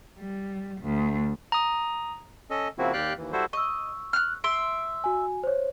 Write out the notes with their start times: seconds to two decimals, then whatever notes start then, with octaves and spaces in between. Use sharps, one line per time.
0.18 G3
0.82 D2
1.52 A#5 D#6
2.50 C#4 A4 D#5
2.78 C#3 F3 A#3 C4 E4 F#4
2.93 D#2 G4 D5 F5 G5 F#6
3.17 D#2 E3
3.32 G3 E4 F#4 A4 C5
3.53 D#5 C#6 E6
4.13 F6 F#6
4.44 E5 C6 D7
5.04 F#4 G#5
5.43 C5 C#5